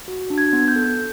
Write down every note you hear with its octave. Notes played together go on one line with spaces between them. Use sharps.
F#4
D4
G#6
B3
G6
A4